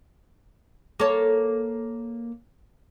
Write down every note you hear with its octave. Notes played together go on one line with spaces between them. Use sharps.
A#3 A4 C#5